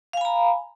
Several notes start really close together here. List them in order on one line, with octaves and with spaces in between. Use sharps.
F5 G#5 B5 A#5